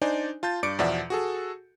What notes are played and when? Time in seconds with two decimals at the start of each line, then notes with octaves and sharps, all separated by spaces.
0.02 D4 D#4 C5 D5 G#5
0.43 F4 A5 G6 A6
0.63 G2 D5 D6 C#7 D7
0.79 E2 B2 F3 D5 E5 F#5
1.10 F#4 G#4 A4